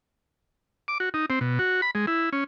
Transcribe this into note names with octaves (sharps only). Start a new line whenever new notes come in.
D6
F#4
D#4
C4
B2
F#4
B5
G#3
E4
C#4